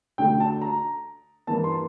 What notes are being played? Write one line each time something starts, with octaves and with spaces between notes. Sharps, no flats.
D2 D3 A3 G5
A5
A#5
G2 E3 A#3 A5
C6